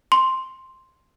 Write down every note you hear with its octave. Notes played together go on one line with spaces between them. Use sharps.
C6